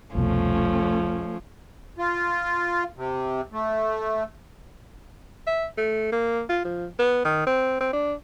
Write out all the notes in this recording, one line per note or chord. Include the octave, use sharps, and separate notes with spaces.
F1 C2 B2 F3 A3 C#4
F4
C3
A3
E5
A3
A#3
F4
F3
B3
D#3
C4
C4
D4